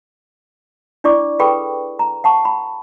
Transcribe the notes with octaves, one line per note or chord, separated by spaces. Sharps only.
D4 E4 D5 C#6 D6
G#4 A4 B4 G5 B5 C#6
A#5
F#5 A5 C#6
B5